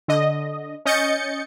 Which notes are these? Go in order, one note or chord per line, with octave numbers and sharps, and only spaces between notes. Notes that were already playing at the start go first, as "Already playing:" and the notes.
D3 D#5
C#4 D#5 G6 A6 C#7